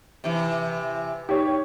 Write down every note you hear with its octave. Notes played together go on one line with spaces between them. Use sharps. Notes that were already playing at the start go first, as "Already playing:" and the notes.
C3 E3
D#4 G4 C#5